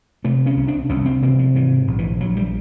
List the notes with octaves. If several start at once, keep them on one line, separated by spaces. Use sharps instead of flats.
C3 A3
C#4
C2
D4
C2 C#4
C4
C3 A#3
F3
G#2 E3
A#1
E3
A#1 F#3
G3